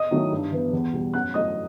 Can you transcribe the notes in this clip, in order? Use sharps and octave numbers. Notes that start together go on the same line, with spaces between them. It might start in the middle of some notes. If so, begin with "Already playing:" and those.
Already playing: D#5 D#6
D#3 F#3 A3 E4
G2
E3 B3
E2
B2 G3
F#2 F#5 F#6
F#3 A3 E4 D#5 D#6